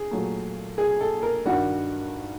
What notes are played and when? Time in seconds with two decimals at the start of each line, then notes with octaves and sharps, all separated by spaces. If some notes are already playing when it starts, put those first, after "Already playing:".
Already playing: G#4
0.11 A#2 F#3 A3
0.78 G#4
1.01 A4
1.23 A#4
1.45 G2 D#3 G3 F#4